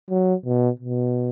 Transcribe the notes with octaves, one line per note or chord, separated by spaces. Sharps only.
F#3
B2
B2